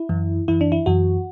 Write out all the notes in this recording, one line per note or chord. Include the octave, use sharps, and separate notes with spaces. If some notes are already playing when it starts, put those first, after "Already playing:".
Already playing: E4
F#2 E3
F#2 E3 E4
D4
E4
F#2 E3 F#4